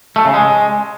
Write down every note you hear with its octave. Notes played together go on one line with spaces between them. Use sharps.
A3
C#3
G#3